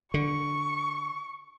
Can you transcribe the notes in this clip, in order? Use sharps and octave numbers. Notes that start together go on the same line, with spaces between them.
D3 C#6